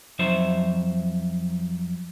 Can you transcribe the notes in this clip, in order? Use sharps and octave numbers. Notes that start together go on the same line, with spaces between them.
F2 F#3 D#4 C5 E5